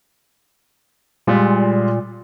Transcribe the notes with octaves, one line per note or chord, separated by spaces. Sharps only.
A#2 G3 G#3 F4